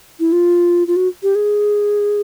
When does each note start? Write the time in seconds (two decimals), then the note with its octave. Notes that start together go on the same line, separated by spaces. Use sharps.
0.20 E4
0.32 F4
0.87 F4
0.96 F#4
1.23 G4
1.35 G#4